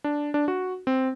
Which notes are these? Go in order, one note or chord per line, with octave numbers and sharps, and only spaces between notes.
D4
D4
F#4
C4